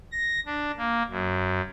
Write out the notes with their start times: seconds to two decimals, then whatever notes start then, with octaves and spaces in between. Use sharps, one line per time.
0.12 A#6
0.46 D4
0.77 A#3
1.10 F#2